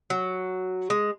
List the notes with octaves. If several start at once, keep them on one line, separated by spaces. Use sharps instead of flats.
F#3
G#3